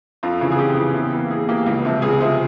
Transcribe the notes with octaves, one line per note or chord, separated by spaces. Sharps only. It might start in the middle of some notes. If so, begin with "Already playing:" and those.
F2 F4
C#3 E3
G#4
F2 G4
C#3 E3
E2
E3 A#3
E2 G#4
E3 A#3 G4
C#2
C3 F3
C#2 G#4
C3 F3